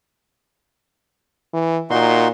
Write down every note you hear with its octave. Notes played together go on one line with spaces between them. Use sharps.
E3
A#2 D#4 F#4 C6